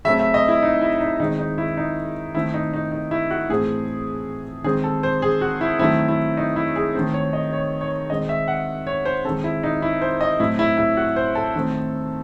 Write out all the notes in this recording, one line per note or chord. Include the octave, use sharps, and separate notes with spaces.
C#3 F#3 A3 C4 E5
E5
D#5
E4
D#4
E4
D#4
D#3 G#3 C4 D#4
D#4
E4
D#4
D#3 A3 C4 E4
D#4
D#4
D#4
E4
F#4
A2 E3 A3 C4 G#4
D#3 G#3 C4 G#4
A4
C5
G#4
F#4
E4
D#3 F#3 A3 C4 E4
E4
D#4
E4
G#4
D#3 A3 C4 C5
C#5
D#5
C#5
C#5
D#3 G#3 C4 D#5
E5
F#5
C#5
C5
D#3 G#3 C4 A4
E4
D#4
E4
C5
D#5
A2 F#3 C4 E4
E4
E4
F#4
C5
A4
D#3 A3 C4